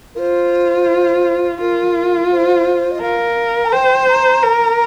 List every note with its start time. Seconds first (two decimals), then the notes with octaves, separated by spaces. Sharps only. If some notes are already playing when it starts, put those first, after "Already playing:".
0.15 A#4
0.19 F4 C5
1.60 F4 A#4
2.31 C5
2.91 D#5
3.02 A#4 F5
3.65 A#5
3.72 C5 G5
4.08 A#5
4.43 A#4